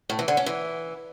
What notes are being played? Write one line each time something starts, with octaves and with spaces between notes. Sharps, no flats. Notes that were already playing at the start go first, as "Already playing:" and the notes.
A2
E3
D3
C#4
E3